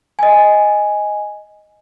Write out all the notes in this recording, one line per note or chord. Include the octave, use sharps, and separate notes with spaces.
D#5 G#5